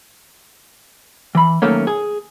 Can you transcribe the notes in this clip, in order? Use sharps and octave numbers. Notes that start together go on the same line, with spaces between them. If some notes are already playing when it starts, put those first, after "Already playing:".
E3 B5
D#3 F#3 A3 A#3 C#4
G#4